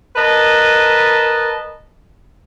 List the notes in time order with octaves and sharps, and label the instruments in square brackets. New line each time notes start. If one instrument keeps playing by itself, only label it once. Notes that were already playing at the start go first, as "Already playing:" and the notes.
[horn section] A#4 B4 D#5 A5